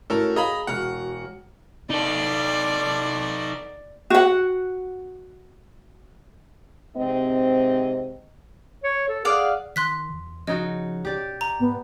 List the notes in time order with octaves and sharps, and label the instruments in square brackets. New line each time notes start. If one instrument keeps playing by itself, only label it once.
[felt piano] A2 C#4 F#4 [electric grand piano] A4 A#4
[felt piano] G#4 F5 [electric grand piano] D#5 A#5 B5
[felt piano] E1 F#4 F6 [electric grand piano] F#5
[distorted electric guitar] D#4 A4 [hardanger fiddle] D5
[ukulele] F#4 F#5
[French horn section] G#2 C3 C4 D#5
[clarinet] C#5
A4
[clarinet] G#4 [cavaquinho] D5 F5 F#5
[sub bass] D#3 [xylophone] C6 F#6 B6
[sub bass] E2
[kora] C#3 D#4 F#4 [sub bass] F3 [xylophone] D#5
[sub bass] B1 [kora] G4 D5
[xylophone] A#5
[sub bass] G#2 [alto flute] B3